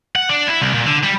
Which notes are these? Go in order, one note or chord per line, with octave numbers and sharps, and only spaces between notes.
F#5
D4
E4
C2
A#2
D3
G3